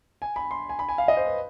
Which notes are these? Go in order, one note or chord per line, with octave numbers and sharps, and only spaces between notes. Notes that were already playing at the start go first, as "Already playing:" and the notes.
G#5
B5
C6
G#5
B5
G#5
F5
D#5
C5
B4